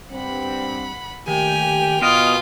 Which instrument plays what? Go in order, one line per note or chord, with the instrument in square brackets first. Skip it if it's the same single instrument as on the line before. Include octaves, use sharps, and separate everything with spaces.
[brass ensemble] G2 C4 [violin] F#5 B5
[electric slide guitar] D#3 [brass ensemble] A3 A#3 G4 [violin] G5 F7 [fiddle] G#5
[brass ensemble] B2 [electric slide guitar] B3 A#4 D#5 [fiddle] F4